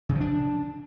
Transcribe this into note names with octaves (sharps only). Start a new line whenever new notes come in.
C#3
F3
D4